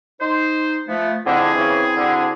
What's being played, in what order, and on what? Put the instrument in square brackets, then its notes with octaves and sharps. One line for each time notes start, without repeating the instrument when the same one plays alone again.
[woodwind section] D#4 C5
F3 A3 B3
[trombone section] F2 D3 [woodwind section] C4 E4 G#4
[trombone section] C#3 E3
D2 D3